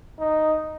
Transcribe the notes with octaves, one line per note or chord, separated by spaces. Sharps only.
D#4